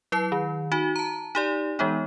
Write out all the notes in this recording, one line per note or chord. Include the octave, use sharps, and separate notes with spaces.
F#3 E4 B4 C7
D#3
D#4 F#4
A5 A#5
D#4 G4 D5
E3 G#3 B3 D#4